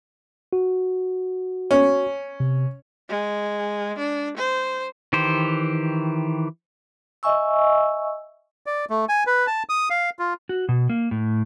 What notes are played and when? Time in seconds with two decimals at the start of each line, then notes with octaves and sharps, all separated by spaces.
0.53 F#4
1.71 C#4
2.40 C3
3.09 G#3
3.98 D4
4.37 C5
5.13 D#3 E3 G4 C5
7.23 D#5 E5 G#5 C#6 E6
8.66 D5
8.90 A3
9.09 G#5
9.27 B4
9.47 A5
9.69 D#6
9.90 F5
10.19 F4
10.49 F#4
10.69 B2
10.90 A#3
11.11 A2